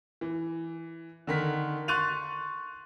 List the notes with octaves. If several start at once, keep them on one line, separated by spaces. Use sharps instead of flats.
E3
D3 D#3 B6
C6 C#6 F#6 A6 D#7 F7